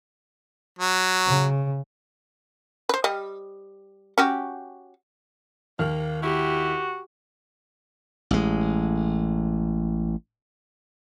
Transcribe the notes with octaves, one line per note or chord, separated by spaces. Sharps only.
F#3
C#3
B4 C5
G3 D#5
C#4 F#4 G4
D#2 A#3 F6
E4 F#4 G4
A1 G#3